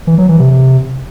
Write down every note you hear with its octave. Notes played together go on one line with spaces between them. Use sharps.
E3
F#3
E3
C3